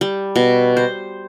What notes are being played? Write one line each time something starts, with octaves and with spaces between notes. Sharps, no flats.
G3
B2
C5